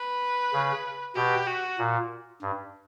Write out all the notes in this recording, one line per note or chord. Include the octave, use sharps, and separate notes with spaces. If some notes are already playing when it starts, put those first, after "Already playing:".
Already playing: B4
C#3
B2 G4
F#4
A#2
G2